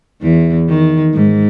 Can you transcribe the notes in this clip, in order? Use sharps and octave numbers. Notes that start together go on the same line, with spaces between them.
E2 E3
D#3
G#2